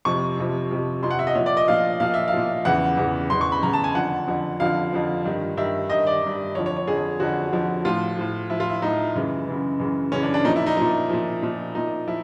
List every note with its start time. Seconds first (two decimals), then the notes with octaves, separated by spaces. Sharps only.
0.05 F2 C3 F3 C#6
0.37 F2 C3 F3
0.71 F2 C3 F3
1.03 F2 C3 F3 C6
1.11 F#5
1.19 E5
1.27 D#5
1.35 A#2 F3 C#5
1.46 D5
1.57 D#5
1.68 A#2 F3 F5
2.00 A#2 F3 F5
2.14 E5
2.28 F5
2.33 A#2 F3
2.65 E2 C#3 E3 F#5
2.97 E2 C#3 E3
3.30 E2 C#3 E3 C6
3.41 C#6
3.52 B5
3.62 E2 C#3 E3 A#5
3.73 A5
3.84 G#5
3.95 F2 D3 F3 F#5
4.27 F2 D3 F3
4.60 F2 D3 F3 F5
4.93 F2 D3 F3
5.25 G2 D#3
5.57 G2 D#3 E5
5.90 G2 D#3 D#5
6.07 D5
6.22 G2 D#3
6.55 F2 D3 F3 C#5
6.66 C#5
6.76 C#5
6.87 F2 D3 F3 G#4
7.20 F2 D3 F3 F#4
7.53 F2 D3 F3
7.85 A2 F3 F4
8.18 A2 F3
8.50 A2 F3 E4
8.60 F4
8.69 E4
8.82 A2 F3 D#4
9.15 F#2 C#3 E3
9.47 F#2 C#3 E3
9.79 F#2 C#3 E3
10.12 F#2 C#3 E3 C#4
10.23 D4
10.34 D4
10.45 A#2 F3 D#4
10.56 E4
10.66 D#4
10.77 A#2 F3 D#4
11.09 A#2 F3
11.43 A#2 F3
11.75 A#2 F3 D#4
12.07 F3 E4